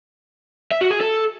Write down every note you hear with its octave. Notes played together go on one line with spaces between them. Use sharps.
E5
F#4
G#4
A4